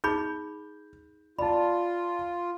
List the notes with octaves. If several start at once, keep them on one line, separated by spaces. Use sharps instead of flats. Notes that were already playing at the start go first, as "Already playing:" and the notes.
D#4 G#4 B5 G6
F4 D5 A5 B5